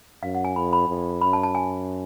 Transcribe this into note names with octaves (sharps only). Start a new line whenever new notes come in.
F#2 F5
F#5
G#5
F2 B5
B5
F2
F#2 B5
A5
A5
G#5